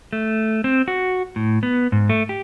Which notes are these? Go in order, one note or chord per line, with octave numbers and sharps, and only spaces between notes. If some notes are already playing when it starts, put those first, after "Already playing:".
A3
C4
F#4
A2
B3
G#2
A3
G4